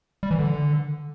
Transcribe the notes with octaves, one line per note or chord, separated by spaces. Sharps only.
G3
E3
D3